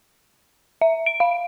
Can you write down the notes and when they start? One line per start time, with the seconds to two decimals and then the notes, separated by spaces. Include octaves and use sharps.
0.81 E5
1.06 D7
1.20 F5